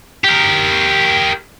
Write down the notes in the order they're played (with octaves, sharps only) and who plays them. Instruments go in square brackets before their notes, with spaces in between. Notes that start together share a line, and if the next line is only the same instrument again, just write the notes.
[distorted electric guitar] G4 A#4